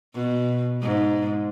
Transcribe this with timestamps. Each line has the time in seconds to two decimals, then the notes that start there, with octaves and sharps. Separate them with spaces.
0.15 B2
0.82 G#2